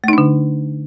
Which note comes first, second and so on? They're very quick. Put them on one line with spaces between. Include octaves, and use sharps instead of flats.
A3 D#4 D4 D3